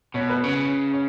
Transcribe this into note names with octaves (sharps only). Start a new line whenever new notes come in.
B2 C#5
B4
C#3 C#5
C#5